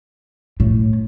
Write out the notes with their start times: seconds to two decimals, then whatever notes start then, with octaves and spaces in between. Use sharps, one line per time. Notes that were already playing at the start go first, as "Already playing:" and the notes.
0.60 A2